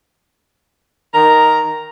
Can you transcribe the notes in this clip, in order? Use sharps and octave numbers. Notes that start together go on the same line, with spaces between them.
D#3 A#4 A#5